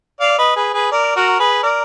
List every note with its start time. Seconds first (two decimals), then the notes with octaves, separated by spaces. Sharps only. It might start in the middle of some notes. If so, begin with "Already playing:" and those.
0.20 D5 F5
0.38 B4 D#5
0.56 G#4 B4
0.74 G#4 B4
0.92 A#4 D5
1.16 F#4 A#4
1.39 G#4 B4
1.63 A#4 D5